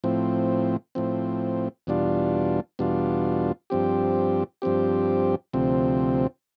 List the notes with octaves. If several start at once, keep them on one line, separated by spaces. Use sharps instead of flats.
A2 F3 C4
A2 F3 C4
E2 B2 G3 D4 F4
E2 B2 G3 D4 F4
G2 F3 C4 G4
G2 F3 C4 G4
D2 C3 F3 C4